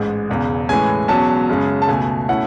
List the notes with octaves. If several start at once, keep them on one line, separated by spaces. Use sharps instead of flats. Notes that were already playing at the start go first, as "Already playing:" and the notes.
Already playing: A1 G#2 G#3
E1 E2 C#3
A2 E3 G#3 C#4 G#5
E1 E2 B2 F#3 C#4 A5
F#2 C#3 G#3 C#4
A5
C#2 B2 A3 G#5
B2 A3 C#4 E4 F#5